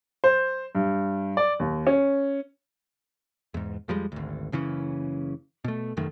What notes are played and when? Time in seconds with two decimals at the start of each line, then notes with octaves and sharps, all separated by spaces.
0.24 C5
0.75 G2
1.37 D5
1.60 D#2
1.87 C#4
3.54 E2 G#2
3.88 F2 F3 G3 G#3
4.12 G#1 D2
4.52 F#1 C#3 E3 C#4
5.64 B2 A3
5.97 F1 F#2 D#3 A3